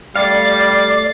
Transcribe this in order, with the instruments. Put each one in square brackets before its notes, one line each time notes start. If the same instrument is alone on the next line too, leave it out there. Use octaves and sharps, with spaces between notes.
[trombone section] G3 [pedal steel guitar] A3 C#5 F5 [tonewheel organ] D5 [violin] A6 C7